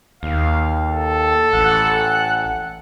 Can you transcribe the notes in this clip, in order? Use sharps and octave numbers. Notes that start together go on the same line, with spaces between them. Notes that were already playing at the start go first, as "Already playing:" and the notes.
D#2 F5
A4
A1 F#5